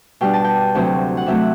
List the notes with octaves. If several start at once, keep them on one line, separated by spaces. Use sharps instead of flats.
B2 G3 D4 G5
A5
G5
D2 C3 F#3 C4
F#5
C3 F#3 A3 C4 E5